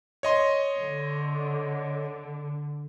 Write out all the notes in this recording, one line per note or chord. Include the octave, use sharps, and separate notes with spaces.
C#5 D#5 C6
D3